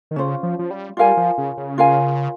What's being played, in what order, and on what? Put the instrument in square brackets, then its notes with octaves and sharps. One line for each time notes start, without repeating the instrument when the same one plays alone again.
[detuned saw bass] D#3
[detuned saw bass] C#3 [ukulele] C#4 F4 C5
[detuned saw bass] F3
F3
G3
[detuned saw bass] G3 [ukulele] F4 A#4 F5 G#5
[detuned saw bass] F3
C#3
C#3
[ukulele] F4 A#4 F5 G#5